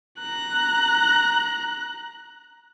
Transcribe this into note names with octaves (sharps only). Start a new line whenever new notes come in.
A#5 F#6